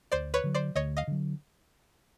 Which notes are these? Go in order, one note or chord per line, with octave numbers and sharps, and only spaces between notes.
D2 C5 D5
B4 C#5
D3 F#3
C5 D5
D2 C#5 D#5
D#5 F5
D3 F#3